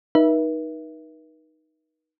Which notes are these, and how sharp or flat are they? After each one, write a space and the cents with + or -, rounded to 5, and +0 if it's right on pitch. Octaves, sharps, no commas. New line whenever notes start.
D#4 +0 B4 -45 E5 +0